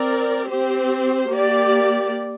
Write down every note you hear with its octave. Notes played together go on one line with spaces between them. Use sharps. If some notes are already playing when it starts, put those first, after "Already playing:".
Already playing: C4 A#4 D5
C4 G4 C5
A#3 G4 D5